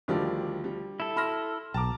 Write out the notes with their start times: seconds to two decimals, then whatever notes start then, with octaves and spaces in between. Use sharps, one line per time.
0.08 D2 D#3 F3 G3 D5
0.64 G3
1.00 E4 A4
1.16 B5 C6 F6 A#6
1.74 B1 A5 A#5 D6